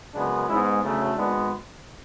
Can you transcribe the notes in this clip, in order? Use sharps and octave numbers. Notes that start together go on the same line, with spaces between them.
F#2 C#3 G#3 B3 D4
G#2 G#3 B3 C#4 E4
D2 C#3 F#3 A3
G#1 G#2 G#3 B3 D4